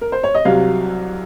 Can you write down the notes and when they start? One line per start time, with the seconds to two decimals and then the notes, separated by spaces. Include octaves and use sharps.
0.01 A#4
0.12 C5
0.23 C#5
0.35 D#5
0.45 C2 C3 F#3 F5